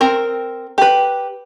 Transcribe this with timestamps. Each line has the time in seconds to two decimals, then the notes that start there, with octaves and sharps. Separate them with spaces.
0.01 C4 A#4
0.78 G4 B4